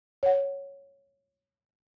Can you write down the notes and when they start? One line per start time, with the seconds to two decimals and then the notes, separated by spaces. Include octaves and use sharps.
0.23 C#5 F#5